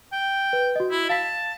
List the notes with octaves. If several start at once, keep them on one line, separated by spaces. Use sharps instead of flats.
G5
B4
F#4 D#5
E4
F5 A5 B6